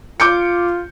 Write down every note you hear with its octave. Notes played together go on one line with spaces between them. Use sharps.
F4 D6 G6 C#7